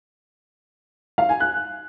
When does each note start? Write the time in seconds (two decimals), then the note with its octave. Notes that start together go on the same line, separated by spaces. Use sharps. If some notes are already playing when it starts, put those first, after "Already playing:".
1.18 F5
1.29 G#5
1.40 F#6